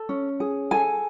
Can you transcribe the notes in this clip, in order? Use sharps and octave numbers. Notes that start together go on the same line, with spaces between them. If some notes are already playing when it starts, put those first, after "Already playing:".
Already playing: A4
C#4
G#4
A4 G#5